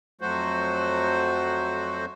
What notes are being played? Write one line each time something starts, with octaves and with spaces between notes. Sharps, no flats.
F2 F#3 A3 F#4 C5